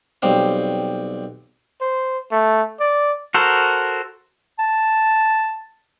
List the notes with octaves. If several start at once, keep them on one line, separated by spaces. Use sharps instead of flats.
B1 G3 C4 F5
C5
A3
D5
F#4 A4 A#4 C5
A5